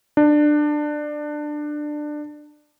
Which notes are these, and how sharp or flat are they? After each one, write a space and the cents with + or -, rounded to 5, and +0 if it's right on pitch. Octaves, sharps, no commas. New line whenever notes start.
D4 +20